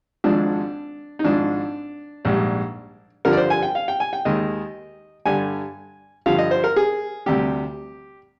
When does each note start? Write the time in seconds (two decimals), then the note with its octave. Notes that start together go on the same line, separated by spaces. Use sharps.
0.24 G#1 G#2 F3 G#3 D4
1.19 D#4
1.24 G#1 G#2 F3 D4
2.25 A#1 G#2 G3
3.25 G2 D3 F3 A#4
3.33 D5
3.37 C5
3.50 G#5
3.63 G5
3.75 F5
3.88 G5
4.00 G#5
4.13 G5
4.25 D#2 D#3 G#3 D#5
5.26 G2 D3 G3 G#5
6.26 G2 D3 F3 F5
6.39 D#5
6.51 C5
6.64 A#4
6.76 G#4
7.26 D2 C3 G3 G4